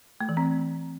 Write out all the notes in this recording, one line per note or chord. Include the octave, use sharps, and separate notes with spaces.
A3
E3
C4